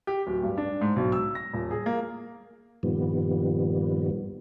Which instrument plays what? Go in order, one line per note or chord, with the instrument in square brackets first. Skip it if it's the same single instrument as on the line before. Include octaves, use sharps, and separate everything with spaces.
[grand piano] G4
D1
G2
D4
G#2
B1
E6
A#6
D#1
G#4
A#3
[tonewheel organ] G2 A#2 D#3 F3 G3 B3